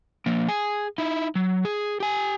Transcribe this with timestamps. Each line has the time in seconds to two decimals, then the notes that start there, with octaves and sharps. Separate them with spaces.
0.26 F3 A#3
0.49 G#4 G#5
0.98 D#4 E4
1.35 F#3
1.65 G#4
2.00 G4 G#5